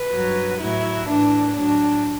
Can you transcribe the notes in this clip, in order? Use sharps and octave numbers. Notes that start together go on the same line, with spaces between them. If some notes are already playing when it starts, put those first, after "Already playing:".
Already playing: B4
G2 F#3
A2 F#3 E4
A2 E3 D4
A2 F#3 D4